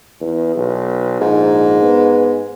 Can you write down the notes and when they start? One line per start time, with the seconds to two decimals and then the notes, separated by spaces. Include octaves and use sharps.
0.21 E2
0.56 B1
1.21 A#1 G#2
1.82 B3